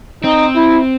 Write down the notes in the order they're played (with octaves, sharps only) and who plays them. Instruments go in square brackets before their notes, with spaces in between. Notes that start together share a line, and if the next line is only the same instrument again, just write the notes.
[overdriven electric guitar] C4 [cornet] D#4
[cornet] E4